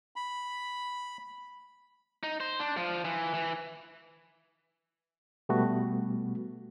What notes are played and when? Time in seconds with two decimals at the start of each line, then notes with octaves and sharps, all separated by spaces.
0.16 B5
2.23 D#4
2.40 C5
2.60 D4
2.77 F3
3.05 E3
3.34 E3
5.49 B2 G3 A3 B3 F#4